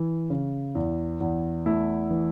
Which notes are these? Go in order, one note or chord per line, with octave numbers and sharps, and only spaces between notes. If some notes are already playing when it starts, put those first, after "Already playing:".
Already playing: E3
C#3
E2
E2
A3 E4
E3